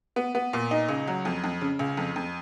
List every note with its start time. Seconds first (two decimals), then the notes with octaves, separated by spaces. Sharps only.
0.16 B3
0.35 B3
0.53 A#2
0.71 D#4
0.89 C#2
1.07 F#3
1.25 F2
1.44 F2
1.61 C#3
1.79 C#2
1.97 F2
2.16 F2